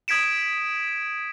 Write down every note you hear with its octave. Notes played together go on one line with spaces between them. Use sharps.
D#6 G#6 B6 D7 E7